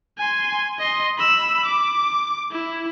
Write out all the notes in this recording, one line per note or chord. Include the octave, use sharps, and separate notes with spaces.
G#5 C6
D#5 C6
B5 E6
D6
E4